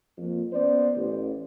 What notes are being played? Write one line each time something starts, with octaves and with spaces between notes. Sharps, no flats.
F2 A#3
B3 C#4 C5 D5
A1